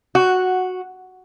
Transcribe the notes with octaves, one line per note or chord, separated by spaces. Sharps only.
F#4